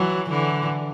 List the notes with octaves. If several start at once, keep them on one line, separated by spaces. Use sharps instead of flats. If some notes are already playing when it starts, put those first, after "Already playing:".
Already playing: E3 F#3
D3 E3